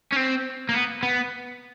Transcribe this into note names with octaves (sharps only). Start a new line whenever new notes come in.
C#4
C4
A#3
B3
B3